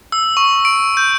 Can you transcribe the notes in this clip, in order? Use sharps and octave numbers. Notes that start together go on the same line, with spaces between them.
E6
C#6
D7
G6